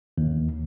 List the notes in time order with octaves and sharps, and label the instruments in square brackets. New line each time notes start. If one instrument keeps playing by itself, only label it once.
[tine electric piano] D#2